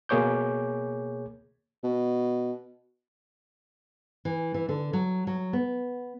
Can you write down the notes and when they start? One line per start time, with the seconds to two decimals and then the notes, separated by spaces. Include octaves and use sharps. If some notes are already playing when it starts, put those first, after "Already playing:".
0.09 B2 A#3 G#4 C#5 D6 G6
1.83 B2
4.25 E3
4.54 E3
4.69 D3
4.93 F#3
5.27 F#3
5.53 B3